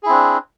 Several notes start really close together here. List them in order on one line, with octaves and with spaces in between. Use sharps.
G#4 E4 C4 D4